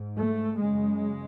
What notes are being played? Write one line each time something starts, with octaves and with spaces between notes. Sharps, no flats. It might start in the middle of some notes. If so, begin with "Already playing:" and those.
Already playing: G#2
A3
F#2 C#3 G#3